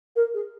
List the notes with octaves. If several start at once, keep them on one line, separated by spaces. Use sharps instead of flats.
A#4
G#4